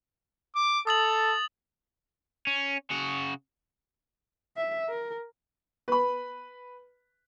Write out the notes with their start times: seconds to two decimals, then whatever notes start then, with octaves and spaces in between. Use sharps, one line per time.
0.56 D6
0.87 A4 D#6 A6 F#7
2.47 C#4
2.90 C#3 F#4
4.57 E5
4.89 A#4
5.88 B4 B5